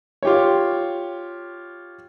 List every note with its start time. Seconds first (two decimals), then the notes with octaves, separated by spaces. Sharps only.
0.23 F4 G4 C#5